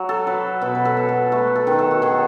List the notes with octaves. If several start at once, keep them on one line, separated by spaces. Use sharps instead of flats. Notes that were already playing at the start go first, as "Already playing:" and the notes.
Already playing: F#3
A4
F#3 B4
B2 B4
B4
A4
B2
A4
A3 B4
A4
D#3
A4
F#4
D#3 G#4